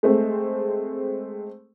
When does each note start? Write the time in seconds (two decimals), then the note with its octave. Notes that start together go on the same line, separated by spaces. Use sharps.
0.03 G#3 A3 C4